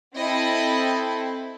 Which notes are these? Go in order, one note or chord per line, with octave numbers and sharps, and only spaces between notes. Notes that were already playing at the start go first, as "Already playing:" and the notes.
C4 E4 A4 D#5